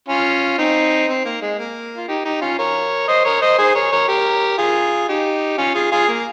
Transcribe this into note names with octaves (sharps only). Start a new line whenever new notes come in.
C#4 F4
C4 D#4
C4
A#3
G#3
A#3
F4
D#4 G4
D#4 G4
C#4 F4
A#4 C#5
C5 D#5
A#4 C#5
C5 D#5
G#4 C5
A#4 C#5
A#4 C#5
G4 A#4
F4 G#4
D#4 G4
C#4 F4
F4 G#4
F4 G#4
A#3